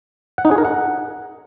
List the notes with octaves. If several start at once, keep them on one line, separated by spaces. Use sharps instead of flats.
F#5
D#4
G#4
A#4
F#5